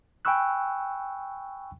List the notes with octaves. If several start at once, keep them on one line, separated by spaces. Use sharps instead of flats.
G5 G#5 B5 C#6 E6 F#6